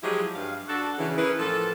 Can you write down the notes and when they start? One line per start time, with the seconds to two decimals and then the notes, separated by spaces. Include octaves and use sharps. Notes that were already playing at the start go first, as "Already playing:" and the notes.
0.03 F3 F#3 G#3 E4 G4 G#4
0.35 G2 F5
0.69 D4 F#4 A4
0.98 C#3 E3
1.17 C#4 E4 G#4 A#4 B4
1.39 A2 F3 A#3 A4